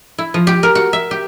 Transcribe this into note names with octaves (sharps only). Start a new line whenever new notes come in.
E4
F3
G4
A#4
F#4
E5
G4